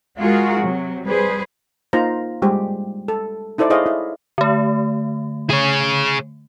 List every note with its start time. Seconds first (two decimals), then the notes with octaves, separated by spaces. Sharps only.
0.19 G#3 F4 F#4 G#4 A#4
0.62 C3 F#3
1.06 G3 G#4 B4 C5
1.93 A#3 D#4 F4 C5 A#5
2.42 G3 G#3 G4 C5
3.08 A4
3.58 D#4 E4 A4 C5 D5
3.70 E4 G#4 C5 C#5 D#5 F5
3.86 E4
4.38 D3 A3
5.50 G#4 C#5